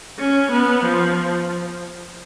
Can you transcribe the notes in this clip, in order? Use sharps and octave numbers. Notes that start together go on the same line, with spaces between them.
C#4
B3
F3